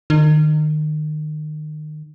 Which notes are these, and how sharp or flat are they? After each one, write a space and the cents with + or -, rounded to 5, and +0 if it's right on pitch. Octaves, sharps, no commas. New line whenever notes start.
D#3 -30